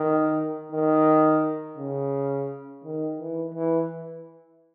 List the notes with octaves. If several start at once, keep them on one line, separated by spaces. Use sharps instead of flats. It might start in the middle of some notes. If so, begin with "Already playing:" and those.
Already playing: D#3
D#3
C#3
D#3
E3
E3